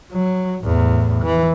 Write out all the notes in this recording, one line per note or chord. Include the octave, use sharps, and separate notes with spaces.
F#3
E2 A2
E3